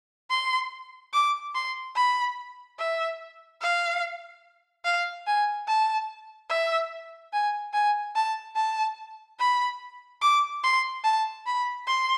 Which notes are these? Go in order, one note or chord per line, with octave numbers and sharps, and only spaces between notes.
C6
D6
C6
B5
E5
F5
F5
G#5
A5
E5
G#5
G#5
A5
A5
B5
D6
C6
A5
B5
C6